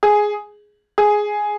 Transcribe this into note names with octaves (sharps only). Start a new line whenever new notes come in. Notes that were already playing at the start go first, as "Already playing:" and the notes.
G#4
G#4